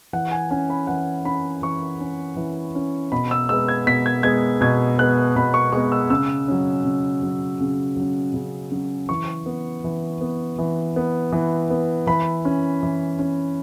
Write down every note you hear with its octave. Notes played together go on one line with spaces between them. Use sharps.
E3 F#5
G#5
C#4 G#5
B5
E3 F#5
C#4 B5
E3 C#6
C#4
E3
C#4
B2 B5
E6
G#3 B3 E6
G#6
B2 B6
G#6
G#3 B3 G#6
B2 G#6
G#3 B3 F#6
B2 B5
C#6
G#3 B3 C#6
E6
C#3 E6
F#3 C#4
C#3
F#3 C#4
C#3
F#3 C#4
C#3
F#3 C#4
E3 C#6
B3
E3
B3
E3
B3
E3
B3
E3 B5
C#4
E3
C#4